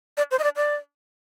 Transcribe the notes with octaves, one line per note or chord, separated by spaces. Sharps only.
D5
C5
D#5
D5
D5